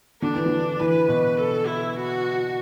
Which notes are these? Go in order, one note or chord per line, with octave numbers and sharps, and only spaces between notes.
D3 D4
E3
D3
E3 B4
B2
A4
E4
F#4